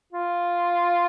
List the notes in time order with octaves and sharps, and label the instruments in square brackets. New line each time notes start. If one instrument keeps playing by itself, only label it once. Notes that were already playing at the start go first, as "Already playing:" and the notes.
[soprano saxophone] F4